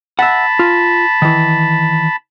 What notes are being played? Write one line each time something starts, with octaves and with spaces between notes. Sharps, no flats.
E5 F#5 A5 B5
F4
D#3 E3